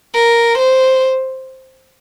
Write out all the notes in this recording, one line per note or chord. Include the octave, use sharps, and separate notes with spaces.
A#4
C5